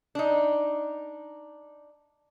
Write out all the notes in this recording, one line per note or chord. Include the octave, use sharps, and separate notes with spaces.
D4 D#4